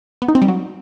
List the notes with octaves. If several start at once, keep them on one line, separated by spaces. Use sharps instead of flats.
B3
D#4
C4
G3
F#3